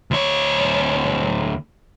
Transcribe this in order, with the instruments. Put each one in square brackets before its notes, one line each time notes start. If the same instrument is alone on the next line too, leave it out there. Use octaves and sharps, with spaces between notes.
[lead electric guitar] D2 C#5